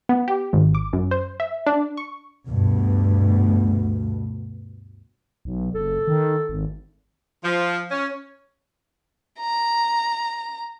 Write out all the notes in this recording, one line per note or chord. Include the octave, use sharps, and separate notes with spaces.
B3
G4
G#1
D6
F#2
C5
E5
D4
C#6
D2 G2 B2
B1
F#1 A4
D#3
G#1
F3
C#4
A#5